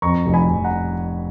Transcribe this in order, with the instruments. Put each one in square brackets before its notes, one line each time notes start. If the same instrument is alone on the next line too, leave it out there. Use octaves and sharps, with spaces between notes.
[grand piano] F2 A#5 C#6
F1
G#5 B5
F1
F#5 A#5